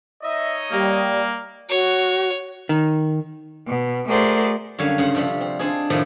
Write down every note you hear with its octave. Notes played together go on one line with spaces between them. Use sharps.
D#4 C#5 D#5 E5
G3 A#3
F#4 C#5
D#3
B2
A3 F#4 G#4 A#4 C5 D5
F#2 D3 G3 C#5 F5
G2 C#3 F#5 C6
C3 F3 G3 C4
C4
C4 D4 D#4 F4 G#4
A2 C3 D#3 F3 D5